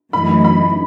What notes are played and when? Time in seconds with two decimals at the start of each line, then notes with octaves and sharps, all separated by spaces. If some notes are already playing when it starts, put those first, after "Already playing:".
0.13 F#2 E3 A3 D#4 B5
0.44 B5